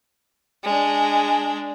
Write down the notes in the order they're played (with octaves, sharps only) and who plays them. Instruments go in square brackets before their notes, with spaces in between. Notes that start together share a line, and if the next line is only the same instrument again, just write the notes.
[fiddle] G#3 D4